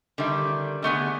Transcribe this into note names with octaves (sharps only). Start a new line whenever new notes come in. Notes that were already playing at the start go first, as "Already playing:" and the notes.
D3 D#3 G3 E5
D3 A3 B3 G#4